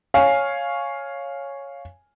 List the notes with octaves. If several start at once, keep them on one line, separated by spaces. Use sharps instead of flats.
C#5 F5 G#5